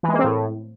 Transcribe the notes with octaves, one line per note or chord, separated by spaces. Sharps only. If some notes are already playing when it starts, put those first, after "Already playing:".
E3
G#3
A#3
C4
A2